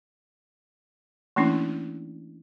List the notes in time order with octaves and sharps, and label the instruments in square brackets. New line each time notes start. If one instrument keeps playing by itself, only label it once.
[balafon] E3 A3 A#3 C#4 D4 E4